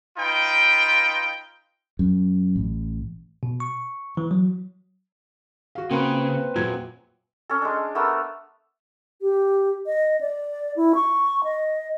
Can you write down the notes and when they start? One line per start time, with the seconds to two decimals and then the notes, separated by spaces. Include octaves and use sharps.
0.18 D#4 F4 B4 G5
1.99 F#2
2.56 A1
3.43 B2
3.60 C#6
4.17 E3
4.31 F#3
5.75 F#4 F5
5.91 C#3 A#3 C4 B4
6.56 F#2 A#2 F#3 G#6
7.50 C#4 A4
7.62 G#3 D4
7.95 A3 B3 A#4 E6
9.21 G4
9.86 D#5
10.21 D5
10.76 E4
10.95 C#6
11.44 D#5